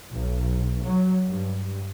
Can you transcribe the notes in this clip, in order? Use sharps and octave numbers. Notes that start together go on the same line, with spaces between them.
B1
F#3
G2